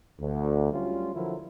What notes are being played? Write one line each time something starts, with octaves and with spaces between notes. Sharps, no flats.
D2
F#3 G3 C#4 F4
D3 F3 F#3 E4 A#4